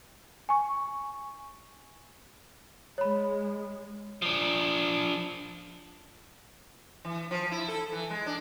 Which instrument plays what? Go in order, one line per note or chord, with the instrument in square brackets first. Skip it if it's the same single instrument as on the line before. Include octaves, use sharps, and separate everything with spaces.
[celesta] G#5 C#6
[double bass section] G#3 [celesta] C#5 B5
[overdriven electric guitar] F3 D4
[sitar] E3
F3
E4
A4
E3
G#3
D4